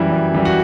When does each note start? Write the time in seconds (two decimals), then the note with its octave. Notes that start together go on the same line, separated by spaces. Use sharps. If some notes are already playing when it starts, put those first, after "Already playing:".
Already playing: F#2 E3 G3 E4
0.12 F#2
0.35 E3 G3
0.45 F#4